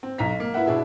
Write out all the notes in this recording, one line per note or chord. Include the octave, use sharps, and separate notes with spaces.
C4
B1 A#5 B6
A#3
E4 B4 E5 F#5
B2 D4 E4 G#4 E5